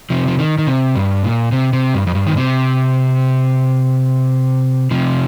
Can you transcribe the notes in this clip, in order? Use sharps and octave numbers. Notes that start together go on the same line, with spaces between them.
C3 F3
F3
D#3
D#3
C3
G2
A#2
C3
C3
G2
F2
G2
D#3
C3
C3 F3